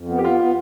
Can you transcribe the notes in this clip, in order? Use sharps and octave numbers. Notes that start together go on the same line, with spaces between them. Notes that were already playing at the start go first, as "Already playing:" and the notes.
Already playing: F2
B3
G4
B3 F4
B3